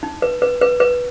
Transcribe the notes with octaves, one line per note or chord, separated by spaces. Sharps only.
D#4
B4
B4
B4
B4